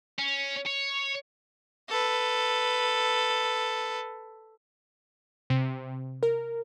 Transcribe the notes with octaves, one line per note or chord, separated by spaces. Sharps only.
C#4
C#5
A4 B4
C3
A#4